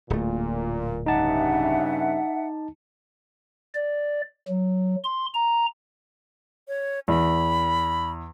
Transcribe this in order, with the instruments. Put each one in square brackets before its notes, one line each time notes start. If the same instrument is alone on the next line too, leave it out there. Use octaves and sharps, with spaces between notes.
[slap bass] D1 A3 [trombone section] A#2
[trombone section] G2 C#3 [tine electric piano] D#4 A5 [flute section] E5 F#5
[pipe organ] D5
F#3
C6
A#5
[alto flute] C#5
[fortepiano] E2 [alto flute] B5